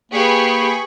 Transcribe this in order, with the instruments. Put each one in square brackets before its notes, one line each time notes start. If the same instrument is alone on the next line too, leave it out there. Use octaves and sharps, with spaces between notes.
[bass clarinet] A#3 [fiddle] G4 B4 [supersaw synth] G#4 B5 C#6